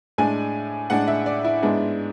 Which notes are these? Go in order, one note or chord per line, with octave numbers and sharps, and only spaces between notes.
A2 G#3 D4 G#5
A2 G#3 D4 F#5
E5
D5
E4
G#2 G#3 B3 D4